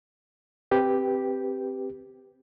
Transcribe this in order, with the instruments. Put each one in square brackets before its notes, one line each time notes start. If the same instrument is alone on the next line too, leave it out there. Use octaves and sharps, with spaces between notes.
[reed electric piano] C4 G4 B4